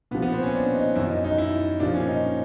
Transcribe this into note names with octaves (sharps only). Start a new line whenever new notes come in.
A#2 F3 B3
B3
C4
C#4
D4
D#4
F#2 D#3 E4
D#4
D#4
E4
A#2 F3 D4
C#4
D#4